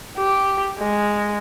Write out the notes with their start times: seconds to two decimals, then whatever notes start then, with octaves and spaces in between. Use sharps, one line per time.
0.17 G4
0.79 G#3